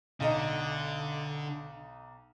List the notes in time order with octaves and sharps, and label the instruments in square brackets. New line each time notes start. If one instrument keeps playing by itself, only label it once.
[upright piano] B1 D#4 [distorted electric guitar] D3